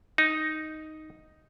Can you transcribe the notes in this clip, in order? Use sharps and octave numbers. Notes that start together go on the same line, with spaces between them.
D#4